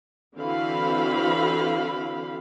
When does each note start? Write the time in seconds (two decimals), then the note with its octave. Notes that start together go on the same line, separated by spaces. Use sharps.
0.36 D3 E3 C4 F#4 F5 B5